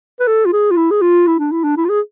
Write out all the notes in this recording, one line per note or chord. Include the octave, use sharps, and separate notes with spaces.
B4
A4
F4
G#4
F4
E4
G#4
F4
E4
D4
E4
D4
E4
F4
G#4